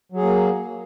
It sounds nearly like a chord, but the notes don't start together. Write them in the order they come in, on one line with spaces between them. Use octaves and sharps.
F#3 G#4 A#3